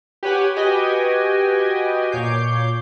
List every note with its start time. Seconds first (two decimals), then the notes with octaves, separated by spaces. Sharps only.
0.23 G4 B4 C#5 F#5 G#5
0.56 F#4 G4 B4 D#5 G5 G#5
2.12 A#2 C#5 D6 G6 C7